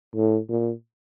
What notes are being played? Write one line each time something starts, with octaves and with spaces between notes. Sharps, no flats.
A2
A#2